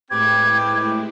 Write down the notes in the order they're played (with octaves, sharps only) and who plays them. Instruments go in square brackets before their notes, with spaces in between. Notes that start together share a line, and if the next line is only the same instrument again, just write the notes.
[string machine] A2 G#3 E4 [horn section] C4 G4 B4 [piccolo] G#6